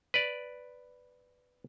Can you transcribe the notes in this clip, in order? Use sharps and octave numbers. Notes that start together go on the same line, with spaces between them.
B4 D5